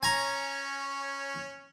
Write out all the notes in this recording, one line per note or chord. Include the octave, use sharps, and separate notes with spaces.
C#4 C#5 G#5 A#5